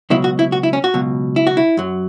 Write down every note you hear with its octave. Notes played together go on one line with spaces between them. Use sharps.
C#2 B2 F#3 E4
F#4
E4
F#4
E4
C#4
F#4
C#2 B2 F#3
E4
F#4
E4
F#2 F#3